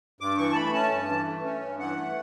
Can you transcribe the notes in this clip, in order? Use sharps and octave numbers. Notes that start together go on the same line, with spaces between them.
G2 D6
E3 C#6
A5
A3 B5
C#4 A5
G2
E3
A3
C#4
G2
E3 F#5
A3